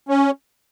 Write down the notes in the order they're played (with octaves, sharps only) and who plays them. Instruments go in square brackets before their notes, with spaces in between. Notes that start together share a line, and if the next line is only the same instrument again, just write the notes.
[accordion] C#4